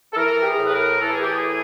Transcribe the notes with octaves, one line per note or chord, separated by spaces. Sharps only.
A4
E3 A#4
G4
G#4
A2
B4
A#4
E3 A4
G#4
G4
G#4
A2